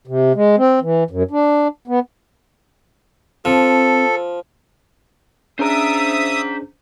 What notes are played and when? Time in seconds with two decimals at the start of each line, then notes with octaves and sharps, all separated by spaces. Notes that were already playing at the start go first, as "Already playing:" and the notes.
0.07 C3
0.35 G#3
0.57 C4
0.81 E3
1.10 F#2
1.31 D4
1.88 B3
3.45 F3 C4 A4
5.59 C#4 D4 G#4 C5 E5 A#5 D#6